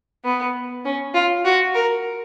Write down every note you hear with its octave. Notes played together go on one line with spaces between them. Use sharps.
B3
C#4
F4
F#4
A#4